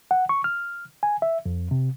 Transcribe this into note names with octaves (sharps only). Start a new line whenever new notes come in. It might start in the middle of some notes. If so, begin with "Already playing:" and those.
F#5
C#6
F6
G#5
E5
F2
C3